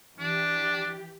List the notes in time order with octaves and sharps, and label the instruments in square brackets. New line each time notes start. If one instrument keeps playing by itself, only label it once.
[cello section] E3 G4 [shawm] D4